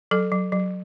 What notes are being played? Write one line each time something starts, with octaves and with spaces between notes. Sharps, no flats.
F#3 A4
F#3
F#3